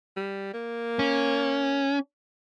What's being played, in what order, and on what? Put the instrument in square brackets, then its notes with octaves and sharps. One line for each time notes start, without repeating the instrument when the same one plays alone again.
[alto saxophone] G3
A#3
[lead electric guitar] C#4